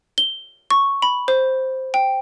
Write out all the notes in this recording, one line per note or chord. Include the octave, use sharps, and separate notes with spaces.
G7
C#6
B5
C5
G5